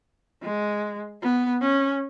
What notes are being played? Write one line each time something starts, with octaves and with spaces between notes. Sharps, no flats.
G#3
B3
C#4